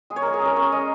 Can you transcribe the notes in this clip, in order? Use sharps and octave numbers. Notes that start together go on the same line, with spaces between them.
G#3 G#4
C#5
G#3 A#4
G#4
C#4 A#4
C#4 C#5
G#3 D#5